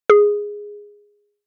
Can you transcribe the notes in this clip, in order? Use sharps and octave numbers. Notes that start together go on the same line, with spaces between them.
G#4